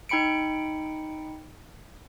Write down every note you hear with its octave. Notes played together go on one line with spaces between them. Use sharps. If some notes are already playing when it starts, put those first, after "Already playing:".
D#4 G5 B5 C#7 D7